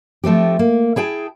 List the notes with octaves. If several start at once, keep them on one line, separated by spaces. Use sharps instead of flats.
F3 A3 C4 G4
A#3
E4 G#4 G5 A5